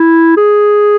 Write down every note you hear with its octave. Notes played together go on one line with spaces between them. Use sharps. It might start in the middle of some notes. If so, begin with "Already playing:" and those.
Already playing: E4
G#4